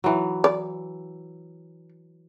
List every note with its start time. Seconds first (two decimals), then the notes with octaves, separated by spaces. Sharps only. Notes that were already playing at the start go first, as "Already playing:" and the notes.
0.04 E3 F#3
0.44 D5